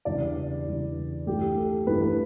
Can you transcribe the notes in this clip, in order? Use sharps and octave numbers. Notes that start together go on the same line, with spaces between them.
E2 C#3 G3 D4 D5
E2 C#3 G3 D4
G2 E3 A3 G4
A4
G2 E3 A3 B4
B4